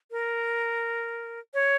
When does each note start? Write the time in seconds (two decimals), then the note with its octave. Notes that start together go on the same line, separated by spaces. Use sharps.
0.11 A#4
1.54 C#5